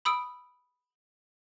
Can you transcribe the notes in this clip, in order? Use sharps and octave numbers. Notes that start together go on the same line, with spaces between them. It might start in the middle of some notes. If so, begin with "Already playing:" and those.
B5 D#6 E6 D7